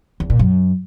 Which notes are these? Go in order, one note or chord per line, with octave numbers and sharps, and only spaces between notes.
E2
A#2
F#2